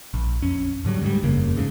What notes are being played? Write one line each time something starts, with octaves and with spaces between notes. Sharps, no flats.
A#1
F2 C#4
G#2 D3 F#3 G3
D2 G#2 F#3 G3
F#1 E2 C#3 A#3
D2 G#2 C#3